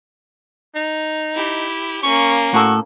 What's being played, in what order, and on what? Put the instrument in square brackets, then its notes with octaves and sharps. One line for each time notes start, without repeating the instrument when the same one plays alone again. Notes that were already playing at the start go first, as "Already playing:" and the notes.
[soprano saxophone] D#4
[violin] E4 G4
[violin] A#3 C#4 [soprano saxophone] C#6
[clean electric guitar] A2 A4 [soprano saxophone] F#4